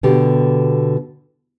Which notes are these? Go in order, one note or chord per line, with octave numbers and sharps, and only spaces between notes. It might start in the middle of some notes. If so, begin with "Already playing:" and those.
B2 D3 G4